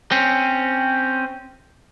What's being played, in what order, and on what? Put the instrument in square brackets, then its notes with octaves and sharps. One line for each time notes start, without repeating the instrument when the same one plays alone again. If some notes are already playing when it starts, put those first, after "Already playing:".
[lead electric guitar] C4 C#4